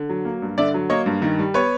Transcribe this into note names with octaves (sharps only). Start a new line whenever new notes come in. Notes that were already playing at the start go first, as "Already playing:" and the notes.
Already playing: D3
F#3
A#3
G2
D3 D5 E5
F#3
A#3 C#5 D#5
G2
D#3
G3
B3 B4 C#5